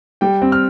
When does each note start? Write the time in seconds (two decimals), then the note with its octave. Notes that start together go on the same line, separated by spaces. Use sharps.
0.21 G3 G5
0.42 C4
0.52 F6